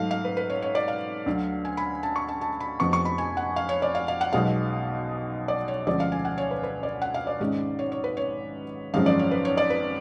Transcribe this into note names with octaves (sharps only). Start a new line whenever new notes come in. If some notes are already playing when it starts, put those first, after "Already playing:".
Already playing: G#2 F#3 A3 F5
F5
B4
B4
C#5
C#5
D5
F5
D2 D3 F#3
G#5
B5
A5
C#6
A5
A5
B5
F1 F2 F3 B3 C#6
C#6
B5
G#5
F#5
F5
C#5
D5
F5
F5
F#5
B1 B2 G#3 B3 F5
D5
C#5
D2 D3 F3 G#3 C#4 D5
F5
G#5
F#5
C#5
B4
B4
D5
F#5
F5
D5
G#1 G#2 G#3 C#4
C#5
C#5
B4
C#5
G#1 F#2 F3 G#3 C#4 F5
D5
C#5
B4
C#5
D5
B4